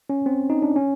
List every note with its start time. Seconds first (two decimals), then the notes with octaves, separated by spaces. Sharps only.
0.10 C#4
0.26 C4
0.50 D#4
0.62 D4
0.76 C#4